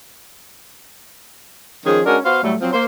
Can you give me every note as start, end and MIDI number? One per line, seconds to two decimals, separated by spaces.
1.85 2.01 51
1.85 2.01 53
1.85 2.01 61
1.85 2.01 68
2.06 2.18 56
2.06 2.18 61
2.06 2.18 62
2.06 2.18 66
2.06 2.18 70
2.25 2.40 59
2.25 2.40 66
2.25 2.40 72
2.25 2.40 77
2.42 2.55 45
2.42 2.55 54
2.42 2.55 55
2.42 2.55 57
2.61 2.69 53
2.61 2.69 54
2.61 2.69 60
2.73 2.85 58
2.73 2.85 72